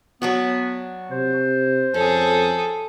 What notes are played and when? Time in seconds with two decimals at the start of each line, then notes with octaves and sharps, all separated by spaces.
0.22 F#3 B3 D4 F#4
1.11 C3 C5
1.94 F2 C#4 G#4 A4